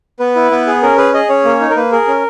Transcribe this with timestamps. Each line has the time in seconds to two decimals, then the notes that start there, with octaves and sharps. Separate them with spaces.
0.19 B3 B4
0.36 E4
0.51 B3
0.67 G#4
0.82 C#4 A#4
0.98 G#4 B4
1.14 G#4 D#5
1.29 C#4 C#5
1.45 A#3
1.60 D#4
1.70 A#4
1.76 A#3 B4
1.92 G#4 A#4
2.07 C#4